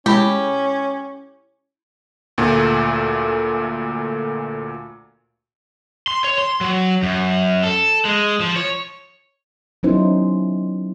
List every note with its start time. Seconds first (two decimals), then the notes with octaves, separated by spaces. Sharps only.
0.06 B2 G#3 C#4 E4 G4 B5
2.38 D2 A#2 A3
6.08 C6
6.24 C#5
6.38 C6
6.61 F#3
7.03 F#2
7.63 A4
8.05 G#3
8.40 F3
8.56 C#5
9.83 F#3 B3 C#4 D#4 E4 C5